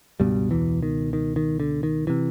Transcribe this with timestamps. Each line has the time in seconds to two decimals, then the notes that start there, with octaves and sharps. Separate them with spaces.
0.20 C#2 G2 B2 G3
0.51 E2 E3
0.83 D#3
1.13 D#3
1.36 D#3
1.60 D3
1.83 D#3
2.07 C3 E3